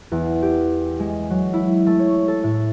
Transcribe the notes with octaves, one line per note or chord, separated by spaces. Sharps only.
E2
G4
G#3
F#3
E4
A3
C#5
A4
A2